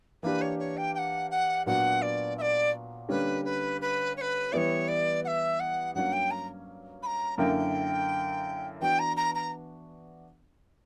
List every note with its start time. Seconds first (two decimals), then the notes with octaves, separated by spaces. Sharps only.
0.23 E3 A#3 D4 G4 B4
0.41 C#5
0.59 C#5
0.77 G5
0.94 G5
0.98 F#5
1.30 F#5
1.66 A#2 F#3 B3 D4 F#4 F#5
2.02 D5
2.38 E5
2.41 D5
3.09 D3 G3 A#3 C#4 B4
3.45 B4
3.81 B4
4.17 C#5
4.21 B4
4.52 E3 G3 B3 E4 C#5 D5
4.88 D5
5.24 F#5
5.27 E5
5.60 F#5
5.94 G2 F#3 A#3 C#4 F#5
6.12 G5
6.31 A#5
7.02 B5
7.06 A#5
7.38 F#2 D3 A#3 E4 A#4 G5
8.80 E3 B3 D4 F#4 G5
8.99 A#5
9.16 A#5
9.35 A#5